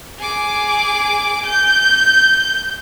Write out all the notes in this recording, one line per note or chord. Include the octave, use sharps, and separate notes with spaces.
G#4 D6
G6